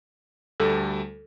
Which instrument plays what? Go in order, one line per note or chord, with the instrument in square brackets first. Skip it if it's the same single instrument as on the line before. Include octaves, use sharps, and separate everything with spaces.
[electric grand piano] D2 G3 A3 [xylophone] A4